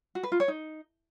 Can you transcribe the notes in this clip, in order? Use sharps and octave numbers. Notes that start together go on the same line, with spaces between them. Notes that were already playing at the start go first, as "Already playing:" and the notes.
F#4
B4
F4
C#5
D#4